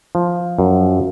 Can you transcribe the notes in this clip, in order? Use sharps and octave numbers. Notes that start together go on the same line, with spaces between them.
F3
F#2